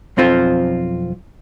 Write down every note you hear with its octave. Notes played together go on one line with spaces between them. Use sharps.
B1 F2 C4 F4 C5